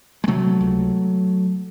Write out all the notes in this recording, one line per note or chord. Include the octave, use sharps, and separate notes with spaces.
G#3
C3 F#3 A3
C#2